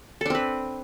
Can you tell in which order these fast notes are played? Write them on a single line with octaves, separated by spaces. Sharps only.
A4 D4 C4 B4